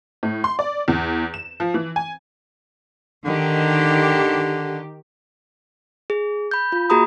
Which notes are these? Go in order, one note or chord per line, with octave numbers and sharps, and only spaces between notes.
A2
C6
D5
E2
E7
F3
E3
G#5
D3 D#3 G4
G#4
B5 G6
F4
A#3 F#4 G#4 A#5 B5 D#6